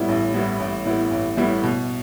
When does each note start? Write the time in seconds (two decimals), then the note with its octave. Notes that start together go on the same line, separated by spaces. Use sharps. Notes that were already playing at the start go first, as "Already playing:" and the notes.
Already playing: A2 G3 B3 E4
0.09 A1
0.34 A2 G3 B3 E4
0.60 A1
0.85 A2 G3 B3 E4
1.11 A1
1.37 A2 G3 B3 E4
1.64 B2